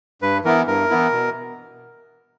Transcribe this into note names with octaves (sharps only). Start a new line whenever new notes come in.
G2 B4
E3 B3 E4 A#4
G2 A#4
E3 B3 E4
B2